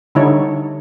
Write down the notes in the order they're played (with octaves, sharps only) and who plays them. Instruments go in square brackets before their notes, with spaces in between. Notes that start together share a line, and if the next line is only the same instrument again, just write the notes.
[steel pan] D3 G3 D#4 E4 C#5